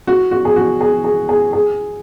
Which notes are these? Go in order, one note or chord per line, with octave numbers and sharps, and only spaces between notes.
F#4
F#4
G#4
F#4
G#4
G#4
G#4
G#4